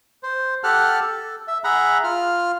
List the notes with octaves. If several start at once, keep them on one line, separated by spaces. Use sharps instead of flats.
C5
G4 A4 F#5 A5 F6 F#6
A4
E5
G#4 E5 F#5 A#5 B5
F4 F6